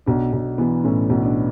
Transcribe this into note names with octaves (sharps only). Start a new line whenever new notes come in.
B1 D4
B1
E3 B3
A2 C#4
B1
D4